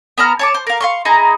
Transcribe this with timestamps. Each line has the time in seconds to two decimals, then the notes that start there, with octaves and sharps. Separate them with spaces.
0.18 B3 A5 A#5 F6
0.39 C#5 A5 D6
0.54 C5
0.67 A#4 F5
0.81 F5 C6 C#6
1.05 D#4 E4 G#4 A#5